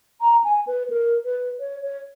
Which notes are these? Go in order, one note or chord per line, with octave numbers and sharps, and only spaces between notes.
A#5
G#5
B4
A#4
B4
C#5
C#5